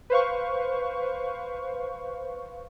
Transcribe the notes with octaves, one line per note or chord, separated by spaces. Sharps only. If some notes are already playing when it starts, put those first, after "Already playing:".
B4 C5 F5 C#6